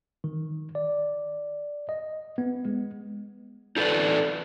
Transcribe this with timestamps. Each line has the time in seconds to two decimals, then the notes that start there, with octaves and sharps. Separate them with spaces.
0.24 D#3
0.75 D5
1.89 D#5
2.38 B3
2.65 G#3
3.76 D#4 A4 B4 D5